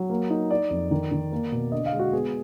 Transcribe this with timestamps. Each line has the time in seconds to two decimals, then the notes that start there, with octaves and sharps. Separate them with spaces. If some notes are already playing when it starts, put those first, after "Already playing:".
Already playing: F#3
0.10 A#3
0.30 D#4
0.51 D#4 D5
0.70 F2
0.91 D#3
1.12 D#3
1.32 A#3
1.52 B2
1.72 D3 D#5
1.86 F5
1.93 G#3
1.99 F#4
2.13 B3 G#4